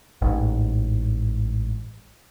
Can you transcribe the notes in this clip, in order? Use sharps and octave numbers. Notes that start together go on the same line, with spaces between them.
A1 G#2